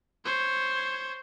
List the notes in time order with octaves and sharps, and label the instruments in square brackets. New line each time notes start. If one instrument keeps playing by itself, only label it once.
[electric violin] C5 C#5